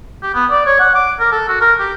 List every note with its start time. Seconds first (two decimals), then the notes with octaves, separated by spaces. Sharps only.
0.23 G4
0.35 B3
0.51 D5
0.66 C#5
0.80 F#5
0.95 D6
1.20 A#4
1.32 A4
1.48 F#4
1.61 A#4
1.80 G4